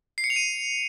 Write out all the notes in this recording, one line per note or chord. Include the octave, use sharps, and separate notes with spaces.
C7
C#7
F7
D#7